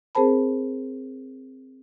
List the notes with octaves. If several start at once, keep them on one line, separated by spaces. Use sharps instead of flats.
C4 G#4 A#4 C5 A5 B5